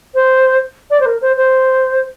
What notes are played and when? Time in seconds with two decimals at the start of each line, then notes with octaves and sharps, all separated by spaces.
0.15 C5
0.90 D5
1.00 C5
1.06 A#4
1.22 C5
1.37 C5